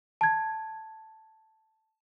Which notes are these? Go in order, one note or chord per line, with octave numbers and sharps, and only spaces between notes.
A5 G#6